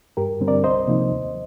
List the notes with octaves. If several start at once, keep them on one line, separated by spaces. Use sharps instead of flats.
G2 G4 A#4
D3 G3 C4
A#4 D5
C2 C5 D#5
C3 F3 A#3 D#4
D#2